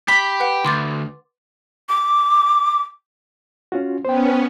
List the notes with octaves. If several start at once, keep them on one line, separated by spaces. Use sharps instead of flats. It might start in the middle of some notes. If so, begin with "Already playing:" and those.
G4 B5
B4 F#5
D2 C6 D6 A6
D6
C#4 F4 F#4
B3 C#4 C5 G5